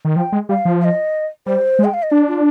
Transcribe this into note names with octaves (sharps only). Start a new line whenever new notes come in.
D#3
F3 G5
G#3
G3 F5
F3
F5
D#5
G3 C5
G#3
G5
F5
D#5
D4 D5
F4